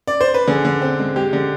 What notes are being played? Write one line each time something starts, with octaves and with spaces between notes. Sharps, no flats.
D5
C5
B4
D3 G#4
D3
C4
G#3
G#3 G4
D3